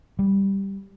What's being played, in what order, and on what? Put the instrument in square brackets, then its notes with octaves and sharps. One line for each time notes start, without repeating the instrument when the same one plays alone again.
[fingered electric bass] G3